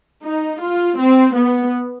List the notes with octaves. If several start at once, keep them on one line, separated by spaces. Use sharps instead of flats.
D#4
F4
C4
B3